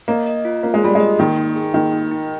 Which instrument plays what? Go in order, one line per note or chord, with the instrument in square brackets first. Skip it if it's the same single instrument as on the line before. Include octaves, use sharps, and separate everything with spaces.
[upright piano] A#3 [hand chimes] D#5
[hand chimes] D#5
F4
[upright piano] A#3 [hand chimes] F4
[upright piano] G#3
[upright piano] G3 [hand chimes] F4
[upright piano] G#3
[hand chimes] D#5
[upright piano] D#3 [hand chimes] A#3
[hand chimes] D#4
G#4
[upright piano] D#3 [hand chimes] A#3
[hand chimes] D#4
D#4